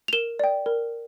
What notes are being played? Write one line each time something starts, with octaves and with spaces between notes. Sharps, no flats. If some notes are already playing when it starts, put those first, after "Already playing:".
F7
A#4 E7 G7
D5 G5
A#4